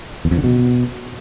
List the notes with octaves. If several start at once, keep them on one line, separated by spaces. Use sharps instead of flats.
E2
F2
D3
B2